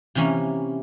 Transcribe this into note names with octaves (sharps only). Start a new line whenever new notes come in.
C3 E3 A#3 C#4